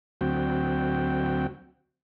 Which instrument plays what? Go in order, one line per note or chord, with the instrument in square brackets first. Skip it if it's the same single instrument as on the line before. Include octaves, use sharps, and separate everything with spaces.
[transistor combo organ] D2 F#3 C4 F#4 G5